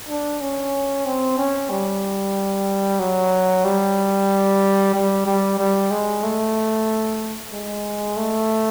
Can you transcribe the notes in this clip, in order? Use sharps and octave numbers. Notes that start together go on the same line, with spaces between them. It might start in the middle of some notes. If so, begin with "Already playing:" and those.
D4
C#4
C4
C#4
G3
F#3
G3
G3
G3
G3
G#3
A3
G#3
A3